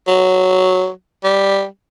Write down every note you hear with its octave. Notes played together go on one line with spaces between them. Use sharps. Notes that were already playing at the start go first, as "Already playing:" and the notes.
F#3
G3